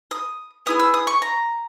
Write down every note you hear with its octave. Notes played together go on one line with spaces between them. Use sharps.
D#6
B3 E4 G#4 D#6
E6
D#6
C#6
A#5